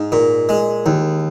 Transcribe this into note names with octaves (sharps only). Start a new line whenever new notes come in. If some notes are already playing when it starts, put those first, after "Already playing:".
Already playing: G#2
A#2
G#3
D#2